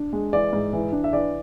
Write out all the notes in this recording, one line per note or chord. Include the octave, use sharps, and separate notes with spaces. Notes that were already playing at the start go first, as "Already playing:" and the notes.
Already playing: D4
G#3
E3 D5
G#2
E3
D4
E5
E3 D5